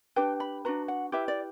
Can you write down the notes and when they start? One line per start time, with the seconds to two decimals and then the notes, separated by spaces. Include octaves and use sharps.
0.16 D4 G4 B4 G5
0.40 B5
0.65 D4 F#4 B4 A#5
0.88 F#5
1.12 E4 G4 B4 E5
1.28 D5